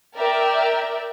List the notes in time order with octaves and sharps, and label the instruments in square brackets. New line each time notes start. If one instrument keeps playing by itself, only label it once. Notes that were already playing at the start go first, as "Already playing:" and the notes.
[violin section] A#4 D5 E5 G5